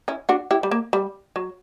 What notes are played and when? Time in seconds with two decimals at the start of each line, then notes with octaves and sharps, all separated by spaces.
0.08 C#4 E4
0.29 D4 F#4
0.51 E4 G4
0.63 G3
0.71 A#3
0.93 G3
1.36 F#3